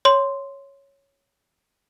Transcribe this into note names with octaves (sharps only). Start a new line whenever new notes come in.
C#5 C6